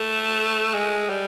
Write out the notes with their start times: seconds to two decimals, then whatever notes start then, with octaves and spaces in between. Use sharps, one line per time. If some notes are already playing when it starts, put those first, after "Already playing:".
Already playing: A3
0.74 G#3
1.09 G3